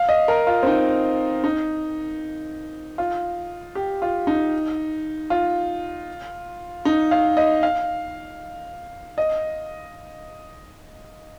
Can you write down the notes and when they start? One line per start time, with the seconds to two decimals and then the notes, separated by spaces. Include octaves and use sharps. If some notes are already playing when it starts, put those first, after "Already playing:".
Already playing: F5
0.09 D#5
0.28 A#4
0.47 F4
0.63 C4
0.66 D#4
1.44 D#4
2.98 F4
3.75 G4
4.02 F4
4.27 D#4
5.30 F4
6.85 D#4
7.11 F5
7.37 D#5
7.63 F5
9.18 D#5